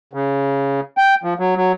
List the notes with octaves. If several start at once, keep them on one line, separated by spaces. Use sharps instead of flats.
C#3
G5
F3
F#3
F#3